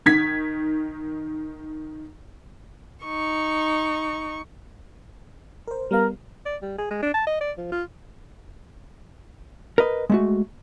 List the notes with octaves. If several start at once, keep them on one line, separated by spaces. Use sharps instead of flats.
D#3 G#6 B6
D#4 C#6
A#4 C5
G3 B3 A#4 F5
D5
G3
G#4
G#3
D4
A5
D#5
D5
F3
F4
A#4 B4 D#5
G#3 A3 F#4